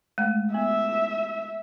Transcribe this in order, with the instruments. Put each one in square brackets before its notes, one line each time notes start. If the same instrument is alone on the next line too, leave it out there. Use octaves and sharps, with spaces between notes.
[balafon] G#3 A3
[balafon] B3 [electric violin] E5